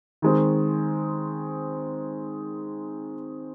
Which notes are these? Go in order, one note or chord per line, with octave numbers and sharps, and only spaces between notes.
D#3 G#3 C4